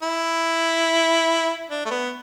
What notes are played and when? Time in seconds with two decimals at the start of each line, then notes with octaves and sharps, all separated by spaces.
0.03 E4
1.70 D4
1.86 A3
1.91 B3